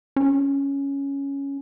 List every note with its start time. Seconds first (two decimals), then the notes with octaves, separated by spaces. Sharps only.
0.16 C#4